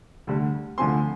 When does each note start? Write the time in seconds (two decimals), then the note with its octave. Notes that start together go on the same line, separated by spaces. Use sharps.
0.27 D2 D3 G3
0.78 D2 D3 F3 C4 G#5 C6